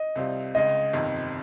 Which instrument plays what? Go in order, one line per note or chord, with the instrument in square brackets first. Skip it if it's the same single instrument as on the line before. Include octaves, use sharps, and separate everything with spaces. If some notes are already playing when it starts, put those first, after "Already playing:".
Already playing: [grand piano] D#5
[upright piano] C2 C3 G3 C4 F4
[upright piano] C#2 C#3 G#3 [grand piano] D#5
[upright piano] G1 F2 C3 D#3